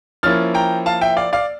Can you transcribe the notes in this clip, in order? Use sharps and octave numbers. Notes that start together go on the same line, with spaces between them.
F3 A#3 C#4 E4 F6 A6
G5 A#5
F5 A5
E5 G5
D5 F5
D5 F5